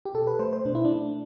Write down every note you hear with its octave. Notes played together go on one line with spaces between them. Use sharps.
G4
B2 A4
B4
A3 C5
C5
B2 D4
E4
D4
A3